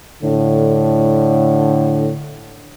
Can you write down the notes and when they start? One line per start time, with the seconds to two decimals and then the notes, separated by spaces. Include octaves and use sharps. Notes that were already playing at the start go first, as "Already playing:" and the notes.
0.23 A2 D3